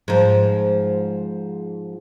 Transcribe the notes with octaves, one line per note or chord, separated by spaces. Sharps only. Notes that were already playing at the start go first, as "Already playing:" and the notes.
G#2 F3